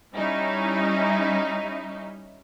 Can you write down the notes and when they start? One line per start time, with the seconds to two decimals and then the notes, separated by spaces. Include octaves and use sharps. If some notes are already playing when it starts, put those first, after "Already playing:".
0.15 G3 C#4 D#4 E4